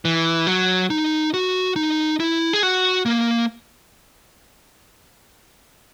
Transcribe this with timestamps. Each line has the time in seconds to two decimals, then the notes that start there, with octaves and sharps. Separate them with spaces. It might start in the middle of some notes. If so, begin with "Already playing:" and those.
0.05 E3
0.47 F#3
0.90 D#4
1.34 F#4
1.76 D#4
2.20 E4
2.53 G#4
2.63 F#4
3.06 A#3